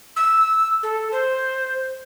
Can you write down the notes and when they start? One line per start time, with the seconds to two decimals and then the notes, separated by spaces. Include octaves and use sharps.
0.16 E6
0.83 A4
1.12 C5